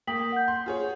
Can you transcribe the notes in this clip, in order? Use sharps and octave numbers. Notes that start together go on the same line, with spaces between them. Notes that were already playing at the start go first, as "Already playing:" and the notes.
A#3 G5 D#6 B6 F#7
F#5 G6
C6
F4 G#4 C#5